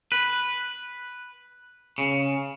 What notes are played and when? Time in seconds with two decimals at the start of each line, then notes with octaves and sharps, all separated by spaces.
0.12 B4
1.98 C#3